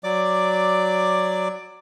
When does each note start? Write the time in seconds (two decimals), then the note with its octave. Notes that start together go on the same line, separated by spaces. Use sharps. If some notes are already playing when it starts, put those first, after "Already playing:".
0.04 F#3 D5 D6